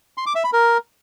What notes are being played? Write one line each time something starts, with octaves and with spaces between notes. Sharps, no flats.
C6
D6
E5
B5
A#4